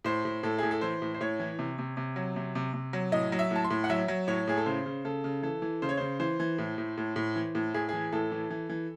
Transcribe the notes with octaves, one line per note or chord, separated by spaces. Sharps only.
A2 C5
A2
A2 A4
A2 G#4
A4
E3 C5
A2
C5
A2 C#5
E3
C3
C3
C3
F#3
C3
C3
C3
F#3
A2 D#5
F#3
E5
A2 A5
C6
A2
F#5
F#3 E5
F#3
A2 C#5
A2 G#4
A4
C#3 C5
C#3
C#3 A4
C#3
E3 A4
E3
C#3 C5
C#5
C#3 C5
E3 C5
E3
A2
A2
A2
A2
E3
A2
A2 G#4
E3 G#4
A2 A4
E3
E3
E3